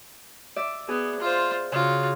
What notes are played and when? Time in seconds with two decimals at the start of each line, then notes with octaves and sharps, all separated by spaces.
0.56 D5 E5
0.88 B3 G#4
1.20 F4 C5
1.72 C#3 F4 F#4